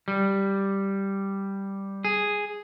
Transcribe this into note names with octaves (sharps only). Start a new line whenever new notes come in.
G3
G#4